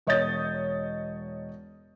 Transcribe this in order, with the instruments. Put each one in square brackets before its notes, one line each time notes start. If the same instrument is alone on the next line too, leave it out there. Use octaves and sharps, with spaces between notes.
[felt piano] E1 C#5 D#5 D#6 G6 A6